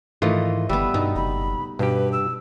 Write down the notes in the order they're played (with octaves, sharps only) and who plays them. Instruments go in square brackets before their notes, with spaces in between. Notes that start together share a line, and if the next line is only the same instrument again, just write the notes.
[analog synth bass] G#2 [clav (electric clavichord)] D#3 E3 F4 [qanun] A3 D#5
[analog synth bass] G1 [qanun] G3 B3 [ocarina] E6
[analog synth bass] G2 [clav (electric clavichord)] B2 [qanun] D#4
[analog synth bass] F#1 [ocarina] B5
[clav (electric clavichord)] G2 G4 [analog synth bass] B2 [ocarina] B4
[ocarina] E6